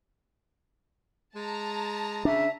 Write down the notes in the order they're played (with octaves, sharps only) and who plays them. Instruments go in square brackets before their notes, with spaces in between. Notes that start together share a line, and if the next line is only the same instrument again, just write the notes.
[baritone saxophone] G#3 [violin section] A5 A#5
[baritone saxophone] C#3 [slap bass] D4 [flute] E5